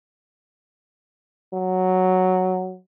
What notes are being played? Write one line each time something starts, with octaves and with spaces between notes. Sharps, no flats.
F#3